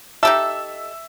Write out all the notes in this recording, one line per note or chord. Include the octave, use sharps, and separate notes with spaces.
D#4 G4 A4 E5